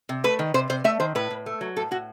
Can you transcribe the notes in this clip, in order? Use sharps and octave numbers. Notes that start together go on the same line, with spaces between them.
C3
A3 B4
D#3
C3 C5
C3 C5
A3 E5
D#3 C5
A2 B4
A2
A3
F#3
A2 A4
A2 F#4